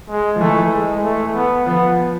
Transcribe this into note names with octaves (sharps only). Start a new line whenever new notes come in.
G#3
F3
E3 A3
G#3
A3
B3
F3 B3